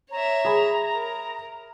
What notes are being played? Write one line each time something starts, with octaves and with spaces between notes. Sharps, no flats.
C#5 E5 A#5
G#4 B5
A#4